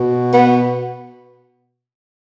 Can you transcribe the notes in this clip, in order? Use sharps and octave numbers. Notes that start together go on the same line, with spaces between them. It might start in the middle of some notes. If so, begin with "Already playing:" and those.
Already playing: B2
B3